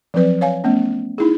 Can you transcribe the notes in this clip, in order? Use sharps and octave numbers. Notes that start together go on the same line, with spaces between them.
F3 F#3 C4 B4 D5
C#5 F5 G#5
A3 B3 C#4
D#4 E4 G#4